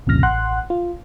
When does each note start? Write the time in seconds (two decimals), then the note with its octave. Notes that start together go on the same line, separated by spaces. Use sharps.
0.06 C2 F2 A#2 C#3 F6 A#6
0.23 A1 F#5 C6 F#6
0.70 F4